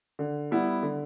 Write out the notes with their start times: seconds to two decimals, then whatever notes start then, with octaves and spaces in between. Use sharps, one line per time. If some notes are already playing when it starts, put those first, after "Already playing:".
0.19 D3
0.51 G3 B3 E4
0.83 D3